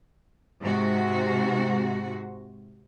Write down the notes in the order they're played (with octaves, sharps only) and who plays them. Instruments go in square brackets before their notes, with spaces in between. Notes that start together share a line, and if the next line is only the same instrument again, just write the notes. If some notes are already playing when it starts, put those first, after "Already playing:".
[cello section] G#2 C3 F#4